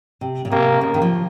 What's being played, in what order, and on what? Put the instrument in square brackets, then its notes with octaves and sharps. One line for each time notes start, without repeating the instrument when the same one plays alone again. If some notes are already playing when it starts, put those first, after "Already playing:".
[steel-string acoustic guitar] C3
A#2
[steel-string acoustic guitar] C3 [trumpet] A#3
[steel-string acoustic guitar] C#3 [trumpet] A#3
[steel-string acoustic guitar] D#3
F3